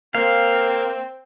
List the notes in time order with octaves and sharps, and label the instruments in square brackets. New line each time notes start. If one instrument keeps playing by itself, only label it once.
[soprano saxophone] A#3 [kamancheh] C4 [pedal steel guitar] F5